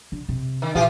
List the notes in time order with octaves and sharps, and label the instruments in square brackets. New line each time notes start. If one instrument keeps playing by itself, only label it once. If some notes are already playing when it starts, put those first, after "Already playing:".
[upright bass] D3
C3
[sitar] D#3
[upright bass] A#2 [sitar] E3 F4 G4